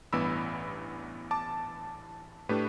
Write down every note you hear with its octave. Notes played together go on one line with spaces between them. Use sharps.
A1 G2 E3 B3 B5 E6
A5 D6
A2 A3 D4 G4 B4